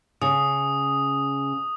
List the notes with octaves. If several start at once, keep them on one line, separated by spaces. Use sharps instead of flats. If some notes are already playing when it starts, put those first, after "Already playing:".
C#3 D#6